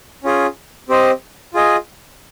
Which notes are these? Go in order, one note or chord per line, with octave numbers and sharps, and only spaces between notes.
C#4 F4 G#4
C4 G4 C5 D#5
F4 G#4 D#5